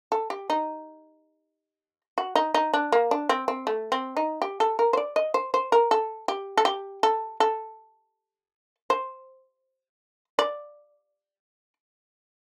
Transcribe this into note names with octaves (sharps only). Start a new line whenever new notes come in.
A4
G4
D#4
F#4
D#4
D#4
D4
A#3
D4
C4
C4
A3
C4
D#4
G4
A4
A#4
C5
D5
D#5
C5
C5
A#4
A4
G4
A4
G4
A4
A4
C5
D5